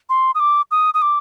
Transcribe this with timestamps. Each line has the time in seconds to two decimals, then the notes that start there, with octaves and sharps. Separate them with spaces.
0.10 C6
0.35 D#6
0.40 D6
0.71 D#6
0.94 D#6
1.02 D6